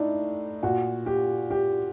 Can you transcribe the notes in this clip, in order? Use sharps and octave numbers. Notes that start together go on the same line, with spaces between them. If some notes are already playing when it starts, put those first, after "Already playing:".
Already playing: A2 D4 D#4
A#2 F#4
G4
G4